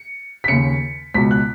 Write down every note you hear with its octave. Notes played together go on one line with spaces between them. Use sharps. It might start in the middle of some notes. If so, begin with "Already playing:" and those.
Already playing: C#7
B6
D#2 C#3 C#7
C#2 B2 B6
F#6